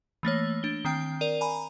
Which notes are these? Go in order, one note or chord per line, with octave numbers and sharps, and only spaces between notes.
E3 A3 A#3 C#5
D4 G7
D#3 C4 G5
A#4 D5 D#7
G#5 A#5 B5